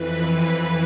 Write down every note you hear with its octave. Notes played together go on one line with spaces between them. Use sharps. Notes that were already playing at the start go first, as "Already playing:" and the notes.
Already playing: F2 E3 B4